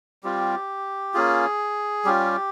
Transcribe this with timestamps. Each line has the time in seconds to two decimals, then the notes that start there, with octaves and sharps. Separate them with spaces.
0.23 G3 C4 F4 G4
1.14 A#3 C#4 F4 G#4
2.05 G3 C#4 F4 G4